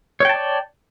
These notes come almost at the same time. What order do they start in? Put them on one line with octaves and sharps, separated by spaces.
C#5 G5 A5 D5